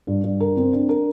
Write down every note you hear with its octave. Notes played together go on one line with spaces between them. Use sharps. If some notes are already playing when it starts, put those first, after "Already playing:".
G2
G2
A#4
C4
D4
A#4